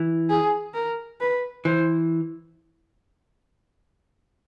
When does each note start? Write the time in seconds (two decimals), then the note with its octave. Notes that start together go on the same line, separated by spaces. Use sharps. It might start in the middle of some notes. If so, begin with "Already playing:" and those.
Already playing: E3
0.29 G#4
0.74 A#4
1.20 B4
1.65 E3 C5